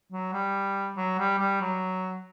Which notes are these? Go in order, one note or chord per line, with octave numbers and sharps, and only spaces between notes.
F#3
G3
F#3
G3
G3
F#3